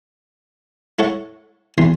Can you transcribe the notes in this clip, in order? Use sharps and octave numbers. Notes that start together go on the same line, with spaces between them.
E4 A4 C#5 F#5
B1 E2 E3 C6